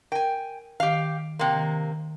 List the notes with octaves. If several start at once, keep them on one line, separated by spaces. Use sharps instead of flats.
A#4 G5 G#5
D#3 G4 F5
C3 A#3 G5 C6
D#3